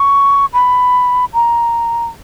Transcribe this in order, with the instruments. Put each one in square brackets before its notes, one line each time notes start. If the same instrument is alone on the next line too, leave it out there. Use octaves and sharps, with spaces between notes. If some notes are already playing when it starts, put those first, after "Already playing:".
Already playing: [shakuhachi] C#6
B5
A#5